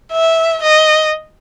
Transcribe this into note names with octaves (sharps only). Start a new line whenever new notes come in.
E5
D#5